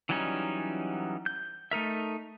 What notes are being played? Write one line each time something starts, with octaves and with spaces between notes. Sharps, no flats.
E3 F#3 G3 C#4 D#4
G6
A3 D#4 A#4 E5